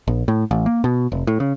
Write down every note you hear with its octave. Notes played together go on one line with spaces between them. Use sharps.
A#1
A2
A1
A#3
B2
F1
A2
C#3